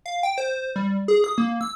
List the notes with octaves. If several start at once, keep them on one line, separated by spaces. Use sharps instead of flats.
F5
G5
C5
G3
G#4
D#6
A#3
E6